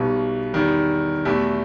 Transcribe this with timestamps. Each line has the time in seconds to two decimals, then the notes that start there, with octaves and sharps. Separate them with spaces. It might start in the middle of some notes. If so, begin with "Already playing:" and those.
Already playing: B1 B2 G3
0.53 E2 D#3 G3
1.25 E2 B2 A3 E4 G4